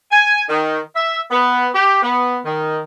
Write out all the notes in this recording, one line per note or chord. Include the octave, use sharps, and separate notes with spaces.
G#5
D#3
E5
B3
G4
B3
D#3